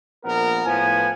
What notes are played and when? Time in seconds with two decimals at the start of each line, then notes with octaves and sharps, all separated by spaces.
0.25 A#1 B3 A#4
0.66 A2 F3 B3 G#5